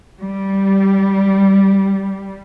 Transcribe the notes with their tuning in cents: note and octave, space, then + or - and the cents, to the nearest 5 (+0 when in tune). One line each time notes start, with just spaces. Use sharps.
G3 -10